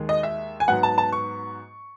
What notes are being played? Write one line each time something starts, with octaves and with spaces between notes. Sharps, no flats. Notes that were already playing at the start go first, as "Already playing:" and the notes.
Already playing: D#2 D#3 G#3
D#5
E5
G#5
G#2 F#3 B3 F#5
A5
A5
C#6